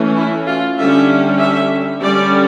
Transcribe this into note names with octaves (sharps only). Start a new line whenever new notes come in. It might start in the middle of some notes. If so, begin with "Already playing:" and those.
Already playing: E3 A3 C#4
E4
F4
D3 G3 C#4 E5
E5
D3 G3 C#4 D5